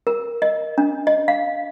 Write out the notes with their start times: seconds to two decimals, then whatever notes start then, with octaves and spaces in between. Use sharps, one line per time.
0.07 A#4
0.42 D#5
0.78 D4
1.07 D#5
1.28 F5